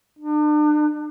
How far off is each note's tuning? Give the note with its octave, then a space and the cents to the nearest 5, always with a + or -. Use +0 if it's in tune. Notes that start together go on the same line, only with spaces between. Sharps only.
D4 +40